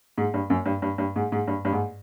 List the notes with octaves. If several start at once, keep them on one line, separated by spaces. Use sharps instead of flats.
G#2
G2
F#2
G2
G2
G2
G#2
G#2
G2
G2
G#2